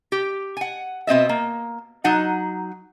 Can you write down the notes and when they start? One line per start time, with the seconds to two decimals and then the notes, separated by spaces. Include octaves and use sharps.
0.12 G4
0.57 F#5 G#5
1.07 B2 C4 D#5 E5
1.29 A#3
2.04 F#3 D#4 F#5